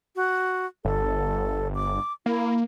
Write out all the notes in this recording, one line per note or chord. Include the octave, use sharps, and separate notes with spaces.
F#4
G1 A4
D6
A#3 E4